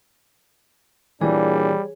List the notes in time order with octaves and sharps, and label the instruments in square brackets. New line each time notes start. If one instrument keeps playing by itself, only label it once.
[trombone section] A#2 D4 [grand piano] E3 [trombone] G3 [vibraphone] G#4 C#5